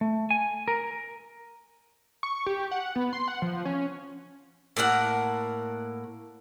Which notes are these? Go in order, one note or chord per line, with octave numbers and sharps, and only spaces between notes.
A3
G#5
A#4
C#6
G4
F#5
B3
C6
F#5
F3
C#4
A2 A#3 A#4 F#5